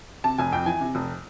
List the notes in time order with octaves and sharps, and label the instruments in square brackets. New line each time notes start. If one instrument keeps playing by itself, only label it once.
[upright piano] C3 A5
F1 G#5
F2 G5
E3 G#5
C3
F1